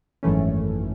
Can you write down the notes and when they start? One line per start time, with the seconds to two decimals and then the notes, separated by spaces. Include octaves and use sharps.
0.23 G#1 F#2 E3 A3 C#4